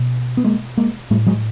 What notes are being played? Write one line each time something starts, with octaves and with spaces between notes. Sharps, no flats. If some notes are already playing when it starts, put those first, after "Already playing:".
Already playing: B2
B3
G#3 A#3
G#3 A#3
A2 G3 A3
F#3 G#3